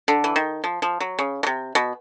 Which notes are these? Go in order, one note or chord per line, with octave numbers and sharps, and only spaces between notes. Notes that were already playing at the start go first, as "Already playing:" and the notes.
D3
E3
D#3
F3
F3
F#3
C#3
B2
C3
B2